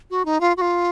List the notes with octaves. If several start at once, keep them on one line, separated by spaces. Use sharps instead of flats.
F#4
D#4
F4
F#4
F4